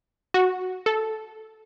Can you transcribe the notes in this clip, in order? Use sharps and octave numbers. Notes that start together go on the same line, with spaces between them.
F#4
A4